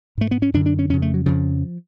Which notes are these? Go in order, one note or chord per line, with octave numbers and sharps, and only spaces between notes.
G#2 A3
B3
C#4
F#2 D3 D4
D4
C#4
F2 C#3 C#4
A3
F#3
F2 C#3 F3